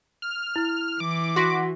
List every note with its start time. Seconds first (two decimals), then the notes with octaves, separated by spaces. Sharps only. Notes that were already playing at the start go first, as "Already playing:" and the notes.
0.22 F6
0.56 E4
1.00 E3 D6
1.36 F#4 C6 A#6 B6